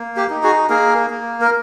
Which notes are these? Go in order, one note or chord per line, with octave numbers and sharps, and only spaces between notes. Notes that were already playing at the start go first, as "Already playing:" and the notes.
Already playing: A#3
G4
D#4
F#4 G#4
A#3 G#4 A#4
A#3
A#4